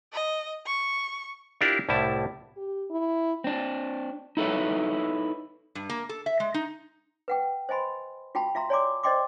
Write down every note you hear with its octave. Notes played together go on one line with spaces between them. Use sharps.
D#5
C#6
D4 E4 F4 G4 A#4 D5
C2 A2 G3 E4 A5
G4
E4
C4 D4
D#4 E4 A4 B4 C#5
G2
A#3
A4
E5
G#3
D#4
B4 F#5 G5
C5 D#5 G#5 B5 C6
F4 F#4 G5 A5 B5
F4 E5 F5 A#5 C6
C#5 D5 G#5 A#5 C6 D6
C5 D5 D#5 G5 C6 D6